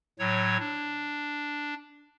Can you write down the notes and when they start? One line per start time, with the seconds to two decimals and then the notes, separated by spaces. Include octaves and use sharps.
0.19 A2 F#3 C#5
0.60 D4